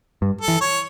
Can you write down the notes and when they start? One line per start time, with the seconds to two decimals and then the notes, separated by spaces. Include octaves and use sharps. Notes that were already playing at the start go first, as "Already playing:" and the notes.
0.22 G2
0.41 A4
0.48 E3
0.61 C#5